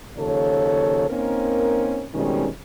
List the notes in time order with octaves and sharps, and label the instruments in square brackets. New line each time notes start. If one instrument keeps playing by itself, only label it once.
[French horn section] D#2 C#3 F3 A4 C#5
A#3 C4 C#4 D#4 A#4
B2 D#3 G3 G#3 C4 C#4